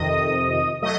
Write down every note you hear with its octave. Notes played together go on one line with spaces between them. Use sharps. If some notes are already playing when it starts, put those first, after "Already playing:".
Already playing: F2 C3 D#3 D#5 D#6
F#3 A3 D#5 D#6